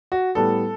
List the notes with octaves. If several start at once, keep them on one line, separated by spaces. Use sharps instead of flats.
F#4
A2 G3 B3 A4